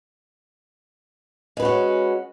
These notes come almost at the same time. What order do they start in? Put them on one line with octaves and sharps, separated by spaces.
G#3 B4 F#4 C#4